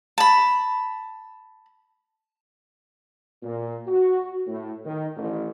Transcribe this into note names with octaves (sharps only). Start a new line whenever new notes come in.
A5 B5
A#2
F#4
A2
D#3
A1